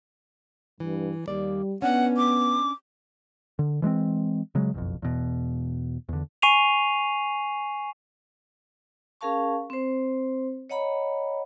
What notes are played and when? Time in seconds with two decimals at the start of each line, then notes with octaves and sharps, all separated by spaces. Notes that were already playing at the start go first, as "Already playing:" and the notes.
0.80 G2 E3
1.28 D#2 G3 A#3 D5
1.82 B3 C#4 D4 F#5
2.17 D6
3.59 D3
3.82 E3 G#3 A3 C4
4.55 C#3 F#3 G#3
4.74 F#1 B1 F2
5.02 E2 B2
6.09 E2 D3
6.42 G#5 C#6 C7 D#7 F7
9.21 C#4 G#4 A#4 F5 A5 C#6
9.70 C4 C5
10.70 C#5 D#5 F#5 A#5 B5